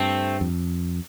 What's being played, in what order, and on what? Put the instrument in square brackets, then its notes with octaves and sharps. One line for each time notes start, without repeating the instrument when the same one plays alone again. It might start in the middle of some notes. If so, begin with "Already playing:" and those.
Already playing: [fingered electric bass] G2 [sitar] A3 C4
[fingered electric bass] F2